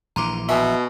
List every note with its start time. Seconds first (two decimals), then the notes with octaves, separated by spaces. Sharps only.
0.16 A#1 E3 A#5 C6 D6
0.49 B2 E5 G#5 A5 C#6